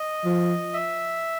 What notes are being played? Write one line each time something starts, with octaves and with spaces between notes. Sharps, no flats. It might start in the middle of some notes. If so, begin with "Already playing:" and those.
Already playing: D#5
F3
E5